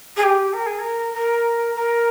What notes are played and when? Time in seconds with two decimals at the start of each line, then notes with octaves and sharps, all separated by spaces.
0.16 G#4
0.23 G4
0.53 A#4
0.66 G#4
0.79 A#4
1.14 A#4
1.75 A#4